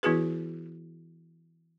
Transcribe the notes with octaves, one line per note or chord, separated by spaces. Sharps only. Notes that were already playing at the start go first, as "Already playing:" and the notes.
E3 B3 E4 F#4 G#4 B4